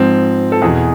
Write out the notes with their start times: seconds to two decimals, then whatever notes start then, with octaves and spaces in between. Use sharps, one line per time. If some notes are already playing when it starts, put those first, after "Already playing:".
Already playing: G#2 F3 C4
0.52 A4
0.62 E2 B2 G#4